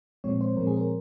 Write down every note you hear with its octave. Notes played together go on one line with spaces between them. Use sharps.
A#2 F3 G#3 C4 C#5
C5
A#2 F3 G#3 C4 A#4
G#4
A#4